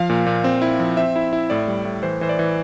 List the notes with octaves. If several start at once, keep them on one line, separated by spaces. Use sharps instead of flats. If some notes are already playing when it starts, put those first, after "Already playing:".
Already playing: F3 F5
A#2
A#2
C4
E4
F3
C4 E5
E4
E4
A2 D5
G3
A2
E3 C5
E3 C5
D5
E3